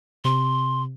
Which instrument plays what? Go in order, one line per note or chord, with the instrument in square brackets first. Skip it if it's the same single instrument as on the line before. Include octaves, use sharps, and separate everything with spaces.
[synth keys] C3 [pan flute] C6